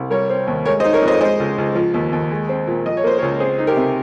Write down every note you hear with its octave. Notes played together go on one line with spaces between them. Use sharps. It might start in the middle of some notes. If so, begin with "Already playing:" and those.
Already playing: C2
G3 A#4 C#5
C4
D#2
G#3 A#4 C#5
C5 D#5
D#4
A#4 C#5
F2
C5 D#5
G#3 C5 D#5
C#2
C#2
F3
D#2
D#2
G#3
C4
A#2
F3 D#5
C#5
A#3 C5
A#4 C#5
C#2
C4 G#4 C5
D#4
G4 A#4
C3